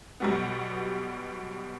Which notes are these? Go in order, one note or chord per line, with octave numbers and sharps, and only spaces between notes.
B1 B2 G3 B3